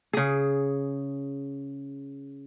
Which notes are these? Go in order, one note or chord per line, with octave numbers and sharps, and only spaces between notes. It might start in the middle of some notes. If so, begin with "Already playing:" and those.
C#3 G#4